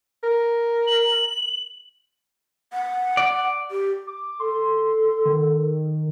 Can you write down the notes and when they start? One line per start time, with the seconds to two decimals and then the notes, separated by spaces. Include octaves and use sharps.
0.23 A#4
0.86 F#7
2.73 F#5
3.17 D5
3.71 G4
4.07 D6
4.40 A4 C6
5.26 D#3